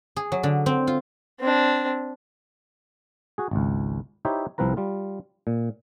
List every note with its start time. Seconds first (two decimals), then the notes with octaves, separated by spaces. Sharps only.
0.16 G#4
0.32 F#3
0.43 D3
0.66 C4
0.87 F4
1.40 C4 D4
3.38 F#4 G#4
3.51 G#1 C#2
4.25 D#4 E4 G4 C5 C#5 E5
4.58 C2 F3 C4 F4 B4 A#5
4.77 G3 F4
5.47 A#2